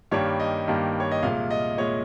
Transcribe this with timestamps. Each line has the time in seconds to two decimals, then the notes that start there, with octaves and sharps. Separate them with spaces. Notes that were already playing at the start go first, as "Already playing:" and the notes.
0.11 G2 D#3 G3 A#3 C#5
0.40 D#5
0.68 G2 D#3 G3 A#3
1.00 C#5
1.11 D#5
1.23 C2 A#2 G#3 F5
1.51 D#5
1.78 A#2 G#3 C#5